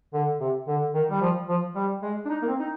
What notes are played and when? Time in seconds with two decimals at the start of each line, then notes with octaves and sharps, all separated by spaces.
0.14 D3
0.40 C3
0.68 D3
0.94 D#3
1.10 G3
1.21 F3
1.49 F3
1.76 G3
2.03 G#3
2.25 D4
2.29 D#4
2.42 A#3
2.48 C4
2.60 D#4